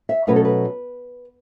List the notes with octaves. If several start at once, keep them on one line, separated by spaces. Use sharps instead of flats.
E5
B2 F#3 A3 C#4 B4
A4
B4